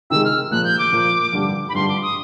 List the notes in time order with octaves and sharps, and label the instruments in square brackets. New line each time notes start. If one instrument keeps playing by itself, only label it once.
[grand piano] C3 D#3 G#3 [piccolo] E6
[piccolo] F6
[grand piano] A#2 F3 A#3 [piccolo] F#6
[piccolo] G6
D6
[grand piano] A#2 F3 A#3
G2 D3 G3
[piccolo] B5
[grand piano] G2 D3 G3 [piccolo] C6
[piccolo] D6
D#6